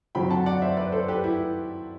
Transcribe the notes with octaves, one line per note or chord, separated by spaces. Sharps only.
F#2 D3 F#3 C4 G5 B5
F#5 A5
D5 F#5
C5 E5
B4 D5
A4 C5
G4 B4
E4 G4